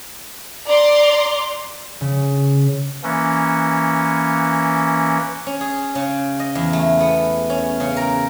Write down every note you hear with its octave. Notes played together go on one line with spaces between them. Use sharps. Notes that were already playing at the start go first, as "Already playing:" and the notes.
D5 A#5 C6 D6
C#3
E3 A#3 C#4
C#4
G#4
C#3
D#5
E2
A3
B3
C#4
C#3
A#4